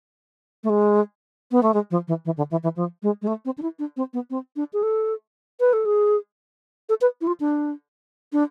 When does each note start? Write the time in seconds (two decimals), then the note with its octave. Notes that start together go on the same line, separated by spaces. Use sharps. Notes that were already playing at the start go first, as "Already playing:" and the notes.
0.64 A3
0.70 G#3
1.51 B3
1.63 A3
1.74 G#3
1.91 F3
2.08 E3
2.25 E3
2.37 D3
2.51 E3
2.63 E3
2.76 F3
3.03 G#3
3.22 G#3
3.27 A3
3.45 C4
3.58 D4
3.62 E4
3.79 D4
3.97 C4
4.13 B3
4.30 C4
4.56 D4
4.73 G#4
4.83 A4
5.60 B4
5.73 A4
5.85 G#4
6.89 A4
7.01 B4
7.21 E4
7.27 F4
7.40 D4
8.33 D4